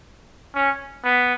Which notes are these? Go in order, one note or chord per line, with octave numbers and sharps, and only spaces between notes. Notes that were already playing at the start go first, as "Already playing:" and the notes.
C#4
B3